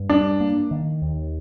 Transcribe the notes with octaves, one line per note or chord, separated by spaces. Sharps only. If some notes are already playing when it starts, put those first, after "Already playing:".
Already playing: G2
G3 D4
A#3
D#3
D#2